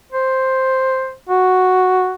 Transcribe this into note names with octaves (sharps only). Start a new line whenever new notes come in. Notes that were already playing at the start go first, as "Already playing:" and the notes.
C5
F#4